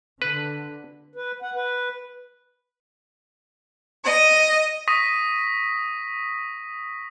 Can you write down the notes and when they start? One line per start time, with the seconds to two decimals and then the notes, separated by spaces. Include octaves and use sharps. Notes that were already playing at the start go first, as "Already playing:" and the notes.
0.22 D3 B4
1.15 B4
1.42 F#5
1.55 B4
4.04 D#5
4.88 C#6 D#6 A#6 B6 D#7